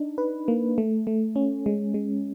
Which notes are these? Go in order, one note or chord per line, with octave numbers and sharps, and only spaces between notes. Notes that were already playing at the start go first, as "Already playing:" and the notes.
Already playing: D4 D#4
B4
A#3
A3
A3
C#4
G#3
G#3